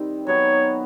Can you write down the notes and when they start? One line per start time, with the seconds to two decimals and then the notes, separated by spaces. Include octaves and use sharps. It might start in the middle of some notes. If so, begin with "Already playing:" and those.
Already playing: D#3 G3 C4
0.27 F#3 B3 D#4 F#4 C#5